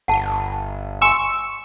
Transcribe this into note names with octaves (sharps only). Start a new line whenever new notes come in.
G1 F#5 A5
G#5 C6 C#6 E6